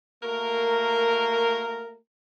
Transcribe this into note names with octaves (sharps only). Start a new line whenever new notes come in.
A3 A#3 F#4 A#4